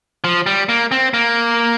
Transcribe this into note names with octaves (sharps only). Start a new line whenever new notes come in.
F3
G3
A#3
C4
A#3